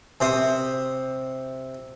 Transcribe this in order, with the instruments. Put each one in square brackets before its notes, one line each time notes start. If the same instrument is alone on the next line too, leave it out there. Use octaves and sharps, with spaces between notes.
[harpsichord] C3 C5 D#6